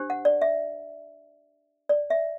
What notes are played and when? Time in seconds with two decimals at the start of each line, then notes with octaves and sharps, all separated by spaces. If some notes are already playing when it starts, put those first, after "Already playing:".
Already playing: D4 G4 C5
0.10 F#5
0.25 D5
0.42 E5
1.89 D5
2.10 E5